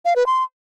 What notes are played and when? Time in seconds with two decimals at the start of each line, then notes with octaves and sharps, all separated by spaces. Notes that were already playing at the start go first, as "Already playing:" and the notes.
0.05 F5
0.16 B4
0.26 C6